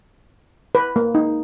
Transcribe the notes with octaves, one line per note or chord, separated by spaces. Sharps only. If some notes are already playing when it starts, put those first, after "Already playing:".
B4
A#3
D#4